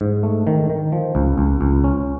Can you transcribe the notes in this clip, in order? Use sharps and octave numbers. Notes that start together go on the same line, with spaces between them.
G#2
A3
D#3
D#3
F3
C#2
C#2
C#2
C#4